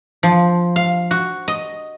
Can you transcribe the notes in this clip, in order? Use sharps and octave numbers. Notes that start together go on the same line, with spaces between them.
F3
F5
F#4
D#5